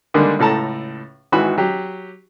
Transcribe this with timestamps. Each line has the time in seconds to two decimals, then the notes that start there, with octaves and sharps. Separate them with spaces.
0.14 D3 D#3 G3 G#3 A#3 D4
0.39 C#2 A2 A4 A5 A#5
1.32 G#1 G#2 E3 F#4 B5
1.58 F#3 G4